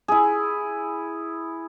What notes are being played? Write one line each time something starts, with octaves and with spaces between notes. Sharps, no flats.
E4 G#4